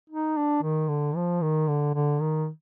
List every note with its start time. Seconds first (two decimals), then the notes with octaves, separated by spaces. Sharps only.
0.10 D#4
0.37 D4
0.62 D#3
0.89 D3
1.16 F3
1.42 D#3
1.68 D3
1.94 D3
2.21 D#3